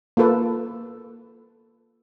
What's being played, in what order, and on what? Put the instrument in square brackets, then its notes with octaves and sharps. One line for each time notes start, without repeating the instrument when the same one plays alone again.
[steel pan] A#3 F4 A4 B4